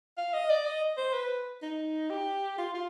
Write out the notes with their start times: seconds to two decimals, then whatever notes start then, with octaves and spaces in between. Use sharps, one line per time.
0.18 F5
0.34 D#5
0.50 D5
0.66 D#5
0.97 C5
1.13 B4
1.62 D#4
2.10 G4
2.58 F4
2.74 F4